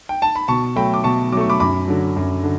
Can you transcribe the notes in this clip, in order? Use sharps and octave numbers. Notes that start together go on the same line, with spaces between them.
G5
A5
B5
B2 A5 C#6
F#3 A3 G5 B5
D6
B2 A5 C#6
F#3 A3 C#6 D6
B5 D6
F#2 B5 D6
D3 F#3
F#2
D3